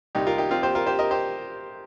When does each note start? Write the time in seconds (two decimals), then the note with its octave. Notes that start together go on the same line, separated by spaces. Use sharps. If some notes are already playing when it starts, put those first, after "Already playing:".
0.15 C2 C3 G3 D#4 G4
0.27 F4 A#4
0.38 D#4 G4
0.51 C4 F4
0.63 G4 C5
0.75 F4 A#4
0.86 G4 C5
0.99 A#4 D#5
1.11 G4 C5